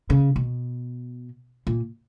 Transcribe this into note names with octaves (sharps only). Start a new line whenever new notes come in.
C#3
B2
A#2